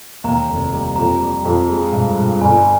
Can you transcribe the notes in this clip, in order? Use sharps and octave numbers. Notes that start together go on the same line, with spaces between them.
D#2 A#5
F1
G3
F2 A#5
G3
F2
G#3
G2
G2
G1 G#5